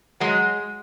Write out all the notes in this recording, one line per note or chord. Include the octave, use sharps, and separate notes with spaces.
F#3 G#3